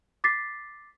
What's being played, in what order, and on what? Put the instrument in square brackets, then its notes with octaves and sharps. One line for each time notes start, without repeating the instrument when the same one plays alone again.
[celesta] D6 A6 B6 C7